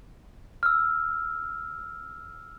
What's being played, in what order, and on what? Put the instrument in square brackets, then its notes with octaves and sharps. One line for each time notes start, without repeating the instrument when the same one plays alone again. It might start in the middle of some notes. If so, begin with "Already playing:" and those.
[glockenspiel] E6 F6